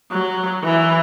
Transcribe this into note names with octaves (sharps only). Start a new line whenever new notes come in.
F#3
E3